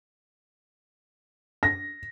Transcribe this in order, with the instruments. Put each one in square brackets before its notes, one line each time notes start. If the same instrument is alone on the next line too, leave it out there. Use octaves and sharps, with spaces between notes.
[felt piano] A#6